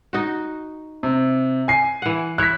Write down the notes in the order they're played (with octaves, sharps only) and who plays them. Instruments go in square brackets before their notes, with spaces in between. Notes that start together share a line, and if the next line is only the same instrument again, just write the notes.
[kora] D#4 F#4
[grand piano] C3
G#5 C7
[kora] E3 F#5
[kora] E4 C#5 [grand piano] F#6 B6